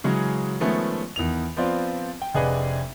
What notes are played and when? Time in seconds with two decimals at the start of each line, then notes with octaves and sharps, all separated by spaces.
0.04 C#3 E3 F#3 G#3 C#4
0.60 D#3 F3 G#3 A3 B3 C#4
1.16 E2 D#3 F7
1.57 F3 B3 C4 F4 D5
2.22 G5
2.35 F1 D4 G#4 B4 D#5 F#5